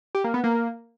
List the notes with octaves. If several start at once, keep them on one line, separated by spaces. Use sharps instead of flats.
G4
A#3
B3
A#3